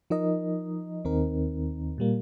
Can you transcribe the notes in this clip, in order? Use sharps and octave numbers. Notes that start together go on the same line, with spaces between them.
F3 D#4 A#4 D#5
D#2 D#3 C4 D#4 A#4
A#2 G3 A#3